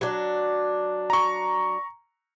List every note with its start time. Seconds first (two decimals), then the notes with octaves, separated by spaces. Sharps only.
0.01 F#3 D4
1.10 A#5 C#6